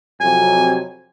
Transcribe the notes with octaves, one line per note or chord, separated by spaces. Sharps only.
F2 C3 F#3 G#5